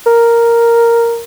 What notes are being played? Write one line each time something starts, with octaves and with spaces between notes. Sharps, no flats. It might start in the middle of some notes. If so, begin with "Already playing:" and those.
A#4